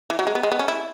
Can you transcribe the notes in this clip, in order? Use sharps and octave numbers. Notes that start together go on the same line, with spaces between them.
E3
F#3
G#3
B3
G#3
B3
C#4
E4